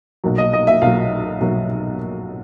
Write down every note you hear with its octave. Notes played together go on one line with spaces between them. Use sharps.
B1 A#2 F#3
D#5
D#5
E5
B1 A#2 F#3 F5
B1 A#2 F#3